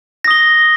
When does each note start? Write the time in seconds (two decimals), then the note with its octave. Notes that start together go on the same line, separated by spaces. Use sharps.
0.24 A#6
0.28 D#6
0.31 G7